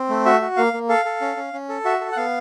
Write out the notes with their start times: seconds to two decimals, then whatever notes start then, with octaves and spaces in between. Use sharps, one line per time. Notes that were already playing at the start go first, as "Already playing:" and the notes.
Already playing: C4
0.09 A3
0.26 F#4 E5
0.42 F#4
0.57 A#3 F5
0.73 A#3
0.89 A4 F5
1.05 A4
1.21 C#4
1.36 C#4
1.53 C#4
1.69 A4
1.85 F#4 E5
2.01 A4
2.12 F#5
2.17 B3 F5